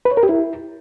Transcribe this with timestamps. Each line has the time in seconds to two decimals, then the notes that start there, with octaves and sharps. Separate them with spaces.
0.05 B4
0.11 C#5
0.17 A#4
0.23 G4
0.29 E4